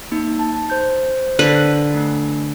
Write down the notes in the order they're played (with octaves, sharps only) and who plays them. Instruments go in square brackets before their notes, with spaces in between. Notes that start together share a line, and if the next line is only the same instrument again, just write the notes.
[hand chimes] A#3 D#4
A5
C5 G6
[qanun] D3 B4
[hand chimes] A3 D4